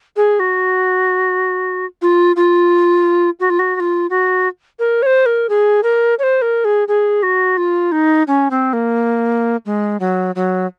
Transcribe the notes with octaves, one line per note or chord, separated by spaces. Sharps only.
G#4
F#4
F4
F4
F#4
F4
F#4
F#4
F4
F#4
A#4
C#5
C5
A#4
G#4
A#4
C#5
C5
A#4
G#4
G#4
F#4
F4
D#4
C#4
C4
A#3
G#3
F#3
F#3